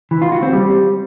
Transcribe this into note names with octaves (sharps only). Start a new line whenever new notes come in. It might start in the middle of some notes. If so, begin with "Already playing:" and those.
E3
F4
F#4
C4
G3